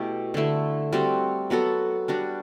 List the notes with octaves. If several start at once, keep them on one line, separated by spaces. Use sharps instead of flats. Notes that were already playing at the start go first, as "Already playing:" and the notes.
Already playing: B2 A3 E4 G4
D3 A3 E4
G3 C4 F#4 A4
F#3 B3 F#4 A4
G3 D4 F#4